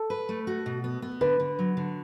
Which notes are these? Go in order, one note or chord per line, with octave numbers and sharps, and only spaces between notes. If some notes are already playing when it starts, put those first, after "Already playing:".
Already playing: A4
B4
A3
F#4
B2
B3
B3
D3 B4
D3
F#3
D3